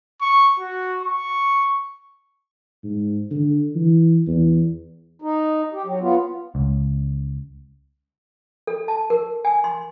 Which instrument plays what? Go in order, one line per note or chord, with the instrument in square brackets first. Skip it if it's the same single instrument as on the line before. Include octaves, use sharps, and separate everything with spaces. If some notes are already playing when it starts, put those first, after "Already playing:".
[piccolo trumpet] C#6
F#4
C#6
[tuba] G#2
D3
E3
E2
[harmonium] D#4
G4
F#3
B3 F4
[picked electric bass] C#2
[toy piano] A4
A5
A#4
G#5
C6